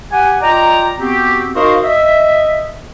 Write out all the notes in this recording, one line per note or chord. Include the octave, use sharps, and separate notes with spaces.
G4 F#5 G#5
F4 D5 D#5 G5 A#5
B3 C4 F#4 G4
D#4 F#4 A#4 C5 D#5 F5
D#5 E5